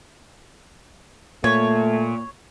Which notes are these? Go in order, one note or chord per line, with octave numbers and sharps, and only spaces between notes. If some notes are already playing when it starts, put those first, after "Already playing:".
A#2 A3 C#5